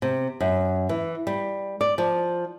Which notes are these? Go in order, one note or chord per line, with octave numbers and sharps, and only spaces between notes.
C3
F#2
E3
G3
D5
F3